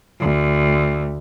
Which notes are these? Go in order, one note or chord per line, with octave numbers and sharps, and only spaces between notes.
D2